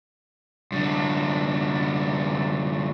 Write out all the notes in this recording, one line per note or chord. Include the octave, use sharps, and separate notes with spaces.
F#2 D3